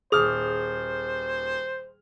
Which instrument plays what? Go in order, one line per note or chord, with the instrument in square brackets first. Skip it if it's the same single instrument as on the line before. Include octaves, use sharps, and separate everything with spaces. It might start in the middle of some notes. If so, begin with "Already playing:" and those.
[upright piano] D#1 F6 F7 [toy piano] G#4 D#6 [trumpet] C5